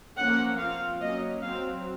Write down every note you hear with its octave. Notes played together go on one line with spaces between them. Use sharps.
F3 A#3 C#4 F#5
F3 C4 F5
F#3 A#3 C#4 D#5
F#3 C4 F5